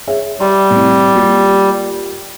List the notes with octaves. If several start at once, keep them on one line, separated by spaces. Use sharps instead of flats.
G#4 C#5 E5
G3 C6
A2 C4
A#3 F4 G4